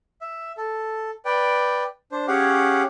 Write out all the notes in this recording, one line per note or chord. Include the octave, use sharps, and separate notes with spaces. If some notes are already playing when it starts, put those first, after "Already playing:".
E5
A4
B4 D5 G5
D4 C5
C#4 G4 G#4 C#5 F5 F#5